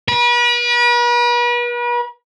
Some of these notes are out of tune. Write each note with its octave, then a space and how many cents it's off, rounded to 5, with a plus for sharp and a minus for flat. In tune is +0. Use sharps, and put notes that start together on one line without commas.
B4 -40